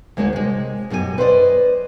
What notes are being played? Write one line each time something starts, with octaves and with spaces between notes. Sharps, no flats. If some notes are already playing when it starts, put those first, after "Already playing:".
D2 G#3 A#3 D#4 F#4 C#5
C3 G#3
F#2 B2 G4 G#4 G#5
B4 C5 D5 D#5